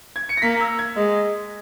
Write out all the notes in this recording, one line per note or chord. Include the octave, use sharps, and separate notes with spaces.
G#6
C#7
A#6
A#3 B6
E6
G#6
G#3